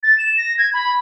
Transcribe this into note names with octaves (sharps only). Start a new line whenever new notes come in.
A6
E7
A#6
G#6
B5